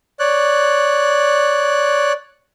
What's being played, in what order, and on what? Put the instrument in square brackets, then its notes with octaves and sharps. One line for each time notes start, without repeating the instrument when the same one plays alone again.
[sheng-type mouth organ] C#5 D5 F#6